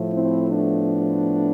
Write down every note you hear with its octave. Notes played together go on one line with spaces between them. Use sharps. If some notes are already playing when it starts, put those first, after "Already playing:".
Already playing: A2 F3 A3
C4 E4
B3 D4